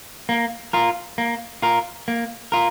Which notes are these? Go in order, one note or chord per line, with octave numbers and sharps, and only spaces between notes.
A#3
F4 A#4
A#3
F4 A#4
A#3
F4 A#4